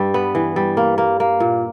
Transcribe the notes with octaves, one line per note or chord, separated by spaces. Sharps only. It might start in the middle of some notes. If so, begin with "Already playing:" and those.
Already playing: G2 G3 G4
B3
E3
G3
A#3
A#3
A#3
A#2